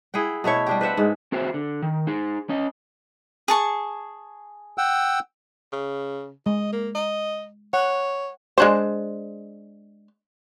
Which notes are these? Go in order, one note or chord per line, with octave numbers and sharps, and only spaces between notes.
E4 G#4 F#5 G5
B2 A3 E4 C#5
G3 D4 G4
B4 C5 E5 F#5
G#2 G#3
C4 F#4 G#4 C5 E5
D3
D#3
D#4 G#4
C#4 D#5
G#4 A5 C#6
F#5 G5 E6
C#3
G#3 D#5
A#3
D#5
C#5 F#5
G#3 D4 C5